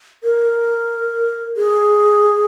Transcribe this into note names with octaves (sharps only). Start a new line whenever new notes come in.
A#4
G#4